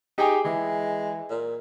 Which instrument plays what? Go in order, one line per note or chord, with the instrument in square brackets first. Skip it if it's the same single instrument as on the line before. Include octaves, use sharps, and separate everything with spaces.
[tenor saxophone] D#4 [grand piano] G4 G#4 G5
[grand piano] E3 [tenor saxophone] G#3
[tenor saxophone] A#2